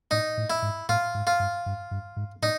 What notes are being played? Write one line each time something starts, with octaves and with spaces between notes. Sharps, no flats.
A2 D#4
A2
E4
G#2
A2 F4
G#2
F4
G2
G2
G2
G#2
A2 D#4